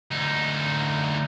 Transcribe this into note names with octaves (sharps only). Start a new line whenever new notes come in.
D2 D#4